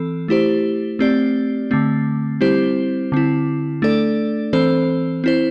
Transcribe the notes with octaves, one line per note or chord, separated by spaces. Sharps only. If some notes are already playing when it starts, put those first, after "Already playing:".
Already playing: E3 C4 A4
A3 E4 G4 C5
A3 C4 G4 D5
D3 A3 C4
G3 C4 E4 G4 C5
D3 C4 E4
A3 D4 A4 D5
E3 C4 A4 C5
C4 E4 C5